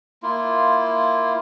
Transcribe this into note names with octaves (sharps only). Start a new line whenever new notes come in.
A#3 E4 F4